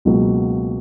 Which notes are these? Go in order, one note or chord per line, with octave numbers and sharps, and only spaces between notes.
C#2 B2 F#3 A#3